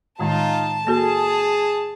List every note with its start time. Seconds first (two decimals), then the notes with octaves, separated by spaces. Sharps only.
0.20 A2 D#3 G#3 D#4 F4 A5
0.87 A#3 F#4 G#4 A4